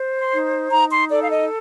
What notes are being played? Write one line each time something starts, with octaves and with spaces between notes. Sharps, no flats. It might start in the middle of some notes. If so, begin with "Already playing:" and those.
Already playing: C5
C6
D#4
D#4 A#5
C6
A4 D5
F5
D#5